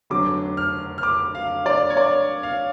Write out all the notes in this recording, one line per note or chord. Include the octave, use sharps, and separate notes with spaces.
F1 F2 D3 F#3 D6
F6
F6
D6
F5
D5
C#5
D5
F5